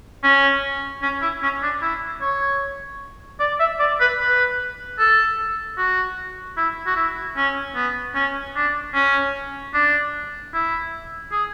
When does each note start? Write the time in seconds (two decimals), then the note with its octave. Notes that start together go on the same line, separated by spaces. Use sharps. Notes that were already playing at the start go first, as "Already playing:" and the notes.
0.23 C#4
1.02 C#4
1.22 E4
1.43 C#4
1.62 D4
1.82 E4
2.21 C#5
3.40 D5
3.59 E5
3.79 D5
4.00 B4
4.19 B4
4.99 A4
5.78 F#4
6.57 E4
6.86 F#4
6.96 E4
7.37 C#4
7.75 B3
8.15 C#4
8.55 D4
8.94 C#4
9.74 D4
10.54 E4
11.32 G#4